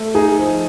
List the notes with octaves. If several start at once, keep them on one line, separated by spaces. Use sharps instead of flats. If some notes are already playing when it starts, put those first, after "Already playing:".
Already playing: A3
D#4 G#4
F3